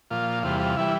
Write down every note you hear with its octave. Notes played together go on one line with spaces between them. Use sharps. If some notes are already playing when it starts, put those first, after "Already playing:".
A#2 F3 F4
E2 C3 G3 F4
F4
E3 G3 E4